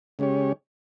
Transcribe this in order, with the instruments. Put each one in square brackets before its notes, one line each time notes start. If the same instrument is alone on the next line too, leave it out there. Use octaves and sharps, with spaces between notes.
[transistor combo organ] C#3 G#3 C#4 G4 C#5